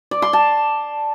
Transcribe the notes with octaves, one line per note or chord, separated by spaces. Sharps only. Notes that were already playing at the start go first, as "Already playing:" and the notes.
D5
C6
A5